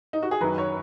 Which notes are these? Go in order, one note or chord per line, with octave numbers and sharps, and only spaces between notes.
D#4
F#4
G#4
F#2 D#3 F#3 B4
C#5